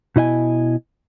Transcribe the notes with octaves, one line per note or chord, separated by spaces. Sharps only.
B2 E4 D#5 G#5